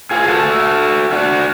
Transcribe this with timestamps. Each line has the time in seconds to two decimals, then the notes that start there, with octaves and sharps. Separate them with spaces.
0.11 F4 G#4
0.28 F#4 A4
1.12 D4 F#4